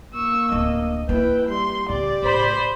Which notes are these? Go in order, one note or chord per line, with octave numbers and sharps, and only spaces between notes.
A#3 C#6 E6
D1 D4 D#5
A#3 E4 B4 G5
G3 C6
A2 C#3 G4 D5
A2 C5 B5